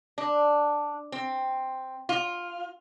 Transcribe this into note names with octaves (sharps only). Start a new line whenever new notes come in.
D4
C4
F4